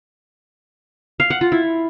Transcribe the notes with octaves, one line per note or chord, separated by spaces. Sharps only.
F5
F#5
F4
E4